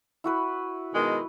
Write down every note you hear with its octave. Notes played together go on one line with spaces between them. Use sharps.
E4 F#4 B4
B2 D#3 G#3